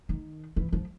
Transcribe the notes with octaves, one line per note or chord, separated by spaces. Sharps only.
D#3
E3
F3